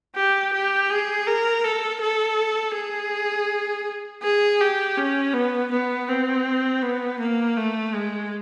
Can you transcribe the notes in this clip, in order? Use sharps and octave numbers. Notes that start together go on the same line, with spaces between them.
G4
G4
G#4
A#4
A4
A4
G#4
G#4
G4
C#4
B3
B3
C4
B3
A#3
A3
G#3